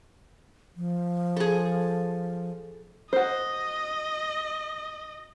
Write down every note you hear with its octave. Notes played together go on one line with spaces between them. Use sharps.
F3
G#4 A4
F#4 C5 D#5